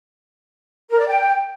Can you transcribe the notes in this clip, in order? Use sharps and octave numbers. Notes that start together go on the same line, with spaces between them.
A#4
D5
G5